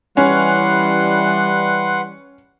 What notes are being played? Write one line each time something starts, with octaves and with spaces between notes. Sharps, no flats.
E3 G3 C#4 B4 F#5 C6